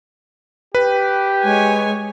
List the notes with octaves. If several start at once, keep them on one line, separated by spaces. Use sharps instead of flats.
G4 B4
G#3 C#5 G#5